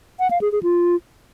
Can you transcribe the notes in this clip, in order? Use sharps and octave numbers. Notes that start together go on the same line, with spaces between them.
F#5
F5
G#4
G#4
F4